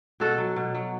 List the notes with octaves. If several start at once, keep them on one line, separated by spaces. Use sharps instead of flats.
B2 F#4 A4
F#3
B2
F#3